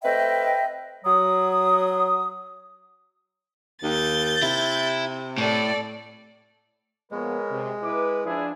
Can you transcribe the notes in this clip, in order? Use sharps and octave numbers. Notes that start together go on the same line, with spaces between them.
A3 C4 B4 D#5 E5 G5
F#3 D#6
D#2 G6 A6
C3 E4
A2 A4 D5
A#2 F3 G#3 B3 A#4 B4 C#5
C3
E4 B4 D6
F3 D4 E4 G#4 E5